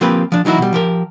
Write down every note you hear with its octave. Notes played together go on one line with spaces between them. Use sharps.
F3 A#3 C4 F4 G4 B4
F3 D4
E3 F#3 D#4 E4 F#4
B2 G3
F3 G4 A#4